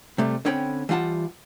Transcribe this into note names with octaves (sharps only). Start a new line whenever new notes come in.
C3 G3 A3
D3 C4 C#4 G5 B5
E3 G3 F4 F#5 A5